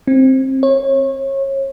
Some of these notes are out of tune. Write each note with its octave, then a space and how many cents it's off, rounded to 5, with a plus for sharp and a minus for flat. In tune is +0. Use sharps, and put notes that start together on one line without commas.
C4 +10
C#5 -30